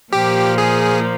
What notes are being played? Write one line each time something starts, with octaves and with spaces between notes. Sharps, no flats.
A#2 F3 A#3 G4
G#4